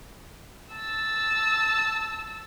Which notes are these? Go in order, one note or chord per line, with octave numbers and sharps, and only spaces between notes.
A5 E6